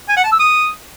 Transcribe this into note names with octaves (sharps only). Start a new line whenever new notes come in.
G#5
F#5
A5
E6
D#6